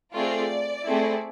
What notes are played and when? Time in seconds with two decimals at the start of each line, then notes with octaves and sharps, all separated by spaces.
0.15 A3 C4 F4 G#4 D5
0.86 A3 C4 E4 G#4